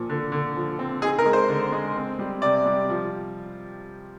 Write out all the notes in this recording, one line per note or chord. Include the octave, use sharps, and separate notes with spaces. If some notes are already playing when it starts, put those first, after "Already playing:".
Already playing: A#2 F3
D3
D3
F3
C4
D#4 G#4
A#4
G#3
C5
D3
G#3
C4
G3
C3 D5
G3
F3